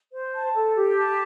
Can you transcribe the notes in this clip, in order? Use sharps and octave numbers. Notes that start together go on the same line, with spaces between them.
C5
A5
A4
G4
A5